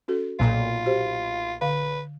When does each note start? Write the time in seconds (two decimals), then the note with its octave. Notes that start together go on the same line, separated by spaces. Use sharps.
0.08 C#4 F#4 A4
0.39 B1 A#2 F4
0.86 F#4 G4 C5
1.61 D3 B4 F5